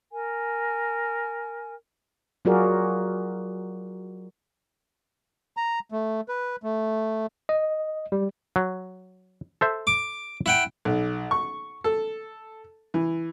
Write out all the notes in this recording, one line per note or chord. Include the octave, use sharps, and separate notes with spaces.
A#4 G#5
F#3 F4 F#4 G#4 A#4 D5
A#5
A3
B4
A3
D#5
G3
F#3
A4 C5 E5
D6
E4 F#5 G5
B1
C#6
A4
E3